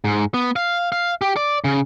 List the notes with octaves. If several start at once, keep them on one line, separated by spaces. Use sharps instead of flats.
G#2
B3
F5
F5
G4
D5
C#3